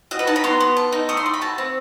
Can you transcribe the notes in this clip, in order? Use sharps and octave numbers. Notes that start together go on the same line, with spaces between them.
F#4 D#5
B4
D#4 A5
B5
B3 C6
B3
A4
D#4
A3 D#6
C6
A3
B5
F#4 A5
C4